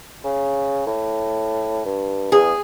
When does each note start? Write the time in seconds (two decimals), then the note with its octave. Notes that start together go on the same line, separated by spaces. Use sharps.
0.24 C#3
0.86 A2
1.86 G2
2.32 E2 G#4